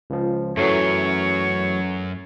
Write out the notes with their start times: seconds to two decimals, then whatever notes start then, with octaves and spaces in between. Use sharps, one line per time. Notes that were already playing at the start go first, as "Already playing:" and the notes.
0.10 C#2 F3
0.57 F#2 E3 F#3 A3 C#5